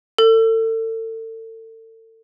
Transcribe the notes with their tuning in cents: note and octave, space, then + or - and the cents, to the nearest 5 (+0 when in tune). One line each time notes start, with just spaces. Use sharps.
A4 +35